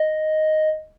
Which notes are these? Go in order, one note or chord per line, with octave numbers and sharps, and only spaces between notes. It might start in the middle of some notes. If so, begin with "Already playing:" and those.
Already playing: D#5